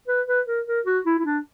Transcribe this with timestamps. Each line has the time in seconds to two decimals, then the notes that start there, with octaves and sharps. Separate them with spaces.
0.08 B4
0.27 B4
0.47 A#4
0.66 A#4
0.85 F#4
1.06 E4
1.18 E4
1.25 D4